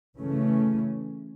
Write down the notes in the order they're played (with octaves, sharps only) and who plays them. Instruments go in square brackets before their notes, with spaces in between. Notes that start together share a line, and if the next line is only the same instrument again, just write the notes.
[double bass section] C#3 E3 A3 C#4